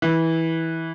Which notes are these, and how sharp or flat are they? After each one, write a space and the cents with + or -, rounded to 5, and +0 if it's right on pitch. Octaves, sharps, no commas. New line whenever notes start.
E3 -15